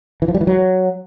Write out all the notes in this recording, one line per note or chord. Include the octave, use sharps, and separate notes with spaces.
E3
F3
G3
E3
F#3